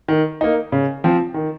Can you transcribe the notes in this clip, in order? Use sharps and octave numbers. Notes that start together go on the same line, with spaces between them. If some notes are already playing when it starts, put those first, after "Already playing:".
D#3
A#3 D#4
C#3
F3 C4
D#3